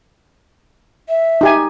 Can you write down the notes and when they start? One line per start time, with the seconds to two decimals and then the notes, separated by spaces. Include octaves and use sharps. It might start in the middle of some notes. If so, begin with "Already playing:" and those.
1.09 E5
1.41 D#4 G4 G#5